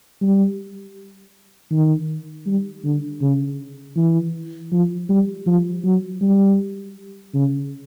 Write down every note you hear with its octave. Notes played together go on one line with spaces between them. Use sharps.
G3
D#3
G3
D3
C#3
E3
F3
G3
F3
F#3
G3
C#3